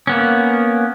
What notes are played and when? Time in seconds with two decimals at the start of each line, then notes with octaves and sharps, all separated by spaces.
0.07 A#3 B3 C#4